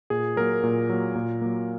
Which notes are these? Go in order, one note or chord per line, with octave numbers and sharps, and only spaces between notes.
A#2 G#4
F#3 A#3 A#4
A#2
F#3 A#3
A#2
F#3 A#3